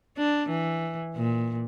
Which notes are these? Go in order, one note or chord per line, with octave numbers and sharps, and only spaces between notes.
D4
E3
A#2